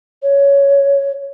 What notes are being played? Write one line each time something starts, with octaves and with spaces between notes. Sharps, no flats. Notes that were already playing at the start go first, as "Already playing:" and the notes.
C#5